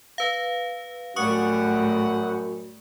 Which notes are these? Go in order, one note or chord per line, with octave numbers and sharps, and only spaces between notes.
B4 F5
F#2 A2 G3 F#5 C#6 D#6 C#7